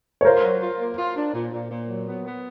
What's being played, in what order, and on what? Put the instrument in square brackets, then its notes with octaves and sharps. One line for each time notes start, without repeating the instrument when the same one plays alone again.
[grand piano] C#5
[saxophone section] F4 [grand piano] A#4 C5
[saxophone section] F#3
F4
A#3
F4
D4
A#2
A#2
A#2
F#3
B3
B3